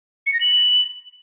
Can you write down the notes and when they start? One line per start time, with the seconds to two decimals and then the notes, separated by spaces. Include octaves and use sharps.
0.26 C#7
0.34 A#6
0.41 F#7